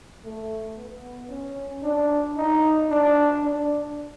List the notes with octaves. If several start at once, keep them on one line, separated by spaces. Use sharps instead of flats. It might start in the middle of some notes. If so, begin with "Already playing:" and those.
A3
B3
C#4
D4
D#4
D4
D4